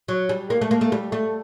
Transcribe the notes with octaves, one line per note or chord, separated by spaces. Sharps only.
F#3
G3
A#3
A3
A#3
A3
G3
A3